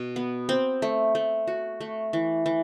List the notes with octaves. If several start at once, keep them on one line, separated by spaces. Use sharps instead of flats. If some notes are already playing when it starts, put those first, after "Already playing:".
Already playing: B2 F#4
B3
C4
A3
A3
F#4
A3
E3
E3